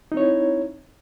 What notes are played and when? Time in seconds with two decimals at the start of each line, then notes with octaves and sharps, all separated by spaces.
0.12 D#4
0.14 C4
0.17 C#5
0.20 E4